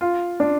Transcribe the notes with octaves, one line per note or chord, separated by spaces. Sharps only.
F4
D4